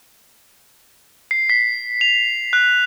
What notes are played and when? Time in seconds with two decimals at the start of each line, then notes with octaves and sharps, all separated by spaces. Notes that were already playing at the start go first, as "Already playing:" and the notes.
1.31 C7
1.50 B6
2.01 F7
2.53 F#6